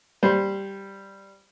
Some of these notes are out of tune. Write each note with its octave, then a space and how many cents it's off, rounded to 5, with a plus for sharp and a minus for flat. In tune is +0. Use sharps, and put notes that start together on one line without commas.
G3 +0 C5 +0